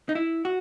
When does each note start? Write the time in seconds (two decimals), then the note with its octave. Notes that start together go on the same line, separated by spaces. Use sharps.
0.09 D#4
0.15 E4
0.45 F#4